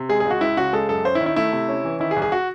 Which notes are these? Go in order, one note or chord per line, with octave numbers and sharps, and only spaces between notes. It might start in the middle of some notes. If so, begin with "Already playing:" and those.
Already playing: C3
G#3 G#4
G#4
C#2
F#4
C#2 E4
C#3 F#4
G#3 A4
F#2 A4
C#4 C5
E4
D#3
E4
A3 E4
C3
C#4
E3
D#3 E4
G#4
C2
G#4
F#4